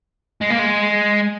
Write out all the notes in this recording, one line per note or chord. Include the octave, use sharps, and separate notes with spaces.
G#3
A#3
G#3